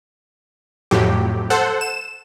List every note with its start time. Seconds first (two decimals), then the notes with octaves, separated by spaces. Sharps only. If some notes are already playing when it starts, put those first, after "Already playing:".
0.91 F2 A2 F#3 G4
1.50 A4 C5 F#5
1.81 E7